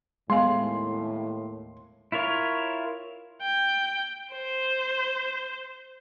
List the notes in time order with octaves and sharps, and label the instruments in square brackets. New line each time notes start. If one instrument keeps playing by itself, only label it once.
[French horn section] D#2 A2 [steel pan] G#3 [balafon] B3 F5 G#5 [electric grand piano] C6
[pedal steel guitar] E4 F4 A#4 C#5
[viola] G5
C5